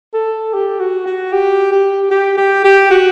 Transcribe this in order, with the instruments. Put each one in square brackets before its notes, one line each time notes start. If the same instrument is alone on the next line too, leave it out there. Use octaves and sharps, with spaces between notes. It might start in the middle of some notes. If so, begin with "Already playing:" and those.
[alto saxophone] A4
G4
F#4
F#4
G4
G4
G4
G4
G4
F#4